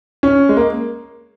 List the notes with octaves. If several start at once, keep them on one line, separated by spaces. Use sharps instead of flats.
C#4
G#3
A#3